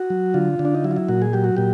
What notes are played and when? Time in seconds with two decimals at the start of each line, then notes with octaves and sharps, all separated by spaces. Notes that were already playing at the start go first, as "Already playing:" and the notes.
Already playing: F#4
0.10 F#3
0.34 D3 F4
0.59 D3
0.65 D4
0.75 D#4
0.84 F#3 E4
0.91 F4
0.96 E4
1.08 A#2 F#4
1.22 G#4
1.33 F#3 G4
1.44 F#4
1.56 A#2 G4